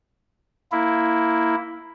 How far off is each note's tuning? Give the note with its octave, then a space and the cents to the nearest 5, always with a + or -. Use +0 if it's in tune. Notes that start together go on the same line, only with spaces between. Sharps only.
A#3 +0 E4 +0